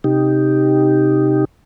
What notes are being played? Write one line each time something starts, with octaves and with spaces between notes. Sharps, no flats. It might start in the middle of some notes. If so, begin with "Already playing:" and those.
C3 D#4 G4